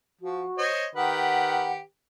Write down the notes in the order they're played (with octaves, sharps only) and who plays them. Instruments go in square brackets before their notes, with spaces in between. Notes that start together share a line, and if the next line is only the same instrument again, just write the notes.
[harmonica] F3 [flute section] F#4
[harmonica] C5 C#5 D#5
[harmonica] D#3 G4 B4 [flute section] F#5